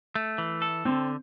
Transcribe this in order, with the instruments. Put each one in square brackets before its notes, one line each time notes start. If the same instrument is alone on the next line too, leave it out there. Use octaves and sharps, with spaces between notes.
[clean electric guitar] A3
E3
A4
[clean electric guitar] D3 [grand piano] C4